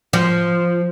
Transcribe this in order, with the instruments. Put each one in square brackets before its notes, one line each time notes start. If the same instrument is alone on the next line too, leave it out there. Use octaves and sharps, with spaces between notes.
[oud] F3